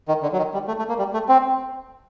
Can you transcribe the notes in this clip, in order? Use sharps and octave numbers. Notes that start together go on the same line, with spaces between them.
D#3
D3
F#3
D#3
G3
A3
A3
A#3
G3
A3
C4